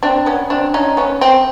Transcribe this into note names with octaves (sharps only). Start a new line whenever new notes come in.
C4 D4
B3 C#4
C4 D4
C#4 D#4
B3 C#4
C4